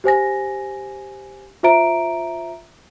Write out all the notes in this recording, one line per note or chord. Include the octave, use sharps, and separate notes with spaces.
G4 C5 G#5 A#6
F4 C5 E5 A#5 D7